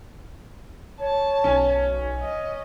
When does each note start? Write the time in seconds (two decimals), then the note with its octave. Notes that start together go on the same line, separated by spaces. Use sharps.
1.00 C#5 A5
1.44 B1 C#4
2.21 D#5